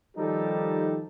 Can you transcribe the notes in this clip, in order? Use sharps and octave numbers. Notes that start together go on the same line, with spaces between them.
D#3 F3 G3 D#4 G4 A4